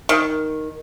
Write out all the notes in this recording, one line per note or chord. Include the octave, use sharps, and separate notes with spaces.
D#3